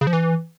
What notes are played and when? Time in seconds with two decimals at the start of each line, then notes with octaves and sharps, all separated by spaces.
0.01 C#3
0.07 F3
0.13 E3